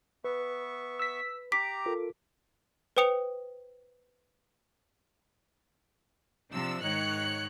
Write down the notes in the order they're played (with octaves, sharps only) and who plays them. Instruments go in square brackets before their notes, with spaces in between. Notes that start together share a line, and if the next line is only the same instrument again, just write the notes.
[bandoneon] B3 E5 C#6 [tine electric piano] B4
[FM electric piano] E6 B6
[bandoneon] G4 A#5 [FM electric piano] D6 [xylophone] B6
[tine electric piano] F4 A4 A#4
[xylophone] B4 C5 G5 D#6 C#7 F7
[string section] C3 F3 D4 E6
G#2 D#3 C#5 F#6 C#7